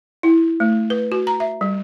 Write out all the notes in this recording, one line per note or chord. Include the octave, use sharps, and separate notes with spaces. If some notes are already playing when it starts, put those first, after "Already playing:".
E4
A3
B4
F#4
A#5
E5
G3